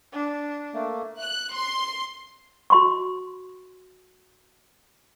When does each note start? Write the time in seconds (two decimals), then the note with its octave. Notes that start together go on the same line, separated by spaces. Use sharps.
0.13 D4
0.74 A3 A#3
1.19 F#6
1.54 C6
2.70 F#4 C6 C#6